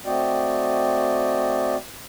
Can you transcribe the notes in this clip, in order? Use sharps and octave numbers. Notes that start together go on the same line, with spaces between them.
A3 C4 F#4 D5 D#5 G5